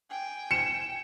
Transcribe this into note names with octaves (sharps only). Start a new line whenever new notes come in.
G5 G#5
C#7 E7